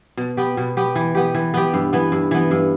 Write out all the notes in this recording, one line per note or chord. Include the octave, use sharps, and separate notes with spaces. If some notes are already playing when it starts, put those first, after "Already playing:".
B2
B3 G4
B2
B3 G4
E3
B3 G4
E3
B3 G4
G2
E3 B3
G2
E3 B3
G2